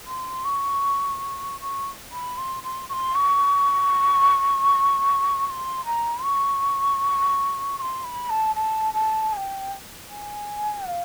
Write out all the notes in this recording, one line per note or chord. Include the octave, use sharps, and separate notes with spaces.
C6
C#6
C#6
B5
C6
C6
C#6
C6
C#6
C#6
C6
A#5
C#6
C#6
C6
B5
A5
A5
A5
G#5
G5
G#5
F5